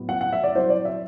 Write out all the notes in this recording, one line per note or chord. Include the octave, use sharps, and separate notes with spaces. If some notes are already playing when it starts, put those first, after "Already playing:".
Already playing: A2 F#3 B3 E4
F#5
F#5
E5
D5
F#3 C4 E4 C5
D5
E5